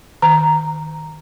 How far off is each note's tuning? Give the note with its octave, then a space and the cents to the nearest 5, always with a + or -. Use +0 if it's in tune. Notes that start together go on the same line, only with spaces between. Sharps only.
D#3 +0 A#5 +0